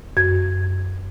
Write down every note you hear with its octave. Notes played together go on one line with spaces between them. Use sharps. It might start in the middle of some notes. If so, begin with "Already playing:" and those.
F#2 G#6